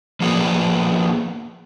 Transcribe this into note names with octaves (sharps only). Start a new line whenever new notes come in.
F3 A#3 B3 G#4 D5